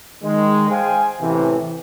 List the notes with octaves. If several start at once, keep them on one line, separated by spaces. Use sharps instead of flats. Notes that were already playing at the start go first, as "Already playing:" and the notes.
D#3 G#3
G#4 C5 F5 G5 G#5
A1 A2 C3 E3